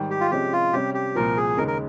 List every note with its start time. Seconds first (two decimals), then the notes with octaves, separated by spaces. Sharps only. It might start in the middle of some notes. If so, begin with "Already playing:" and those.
Already playing: G#2 D#3 G3
0.10 G4
0.21 F4
0.31 C3 F3 G#3 C#4 G4
0.53 F4
0.73 C3 G3 C#4 G4
0.94 G4
1.15 C2 A#2 F3 A#4
1.37 G#4
1.57 D#2 C#3 G#3 A#4
1.67 A#4